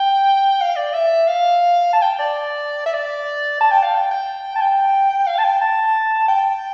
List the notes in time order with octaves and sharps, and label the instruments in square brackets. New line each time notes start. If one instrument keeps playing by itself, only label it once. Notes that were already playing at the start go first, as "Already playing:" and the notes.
Already playing: [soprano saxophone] G5
F5
D5
E5
F5
A5
G5
D5
E5
D5
A5
G5
F5
G5
G5
A5
G5
F5
A5
G5
A5
G5